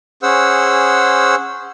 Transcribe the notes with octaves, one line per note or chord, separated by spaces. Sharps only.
C#4 G#4 C5 F#5 E6